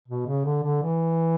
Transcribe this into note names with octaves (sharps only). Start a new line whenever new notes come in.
B2
C#3
D3
D3
E3